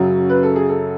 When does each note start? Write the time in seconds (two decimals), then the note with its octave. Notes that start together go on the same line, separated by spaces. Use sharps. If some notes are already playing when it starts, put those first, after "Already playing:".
Already playing: F#2 C#3 F#3
0.29 B4
0.43 A4
0.56 G#4
0.69 A4